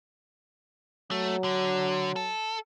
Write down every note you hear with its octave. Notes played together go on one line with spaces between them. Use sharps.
F#3 A3
D3
A4